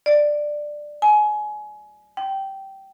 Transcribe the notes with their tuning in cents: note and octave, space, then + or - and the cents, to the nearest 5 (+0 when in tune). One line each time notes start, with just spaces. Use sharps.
D5 +10
G#5 +25
G5 -15